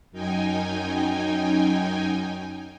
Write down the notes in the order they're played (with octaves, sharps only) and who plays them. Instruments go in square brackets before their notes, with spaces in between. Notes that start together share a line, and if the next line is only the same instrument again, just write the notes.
[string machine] F#2 D#4 G5 G#5